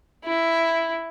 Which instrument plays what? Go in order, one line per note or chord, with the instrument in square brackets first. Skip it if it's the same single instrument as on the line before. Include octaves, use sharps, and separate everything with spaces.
[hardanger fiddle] E4